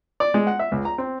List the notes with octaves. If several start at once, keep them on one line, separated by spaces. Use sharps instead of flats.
D5
G#3
F#5
E5
C#2
A#5
C4